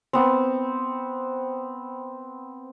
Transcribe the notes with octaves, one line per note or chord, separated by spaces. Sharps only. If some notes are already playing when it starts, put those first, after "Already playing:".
B3 C4